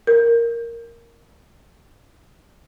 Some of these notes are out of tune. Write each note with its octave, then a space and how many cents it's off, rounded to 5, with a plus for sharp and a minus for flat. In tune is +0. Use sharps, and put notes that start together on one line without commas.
A#4 -5